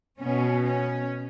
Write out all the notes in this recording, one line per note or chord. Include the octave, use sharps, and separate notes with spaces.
B2 B3 C#4
C#4